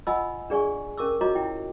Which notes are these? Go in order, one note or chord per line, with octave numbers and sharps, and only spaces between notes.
F4 D#5 F#5 G#5 B5 E6
D4 G#4 D5 G#5 C#6
C#4 A#4 C#6 D6 E6
F4 F#4 C#5 D#5 A#5 D6
E4 G5